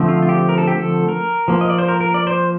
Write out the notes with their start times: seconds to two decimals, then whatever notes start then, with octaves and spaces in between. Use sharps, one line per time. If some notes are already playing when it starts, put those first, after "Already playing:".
Already playing: D3 F3 A3 C4
0.08 F4
0.22 F4
0.29 G4
0.49 A#4
0.58 A4
0.67 G4
0.76 A4
1.08 A#4
1.48 F3 A#3
1.61 D#5
1.70 D5
1.78 C5
1.88 A#4
2.01 A#4
2.14 D5
2.27 C5